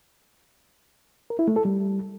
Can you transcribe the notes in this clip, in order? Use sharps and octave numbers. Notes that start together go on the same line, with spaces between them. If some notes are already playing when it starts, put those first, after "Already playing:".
A#4
E4
A3
A4
G3